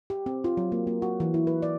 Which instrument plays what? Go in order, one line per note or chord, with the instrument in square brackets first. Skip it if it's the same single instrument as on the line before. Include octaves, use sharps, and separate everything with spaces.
[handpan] G4
C4
F4
F#3
A#3
A#3
F#4
E3
E4
B4
D5